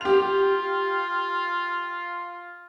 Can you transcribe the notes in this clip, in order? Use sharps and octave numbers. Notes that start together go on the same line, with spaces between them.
F4 G4 F7